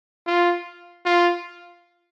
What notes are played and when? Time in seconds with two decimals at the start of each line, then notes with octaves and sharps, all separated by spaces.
0.27 F4
1.06 F4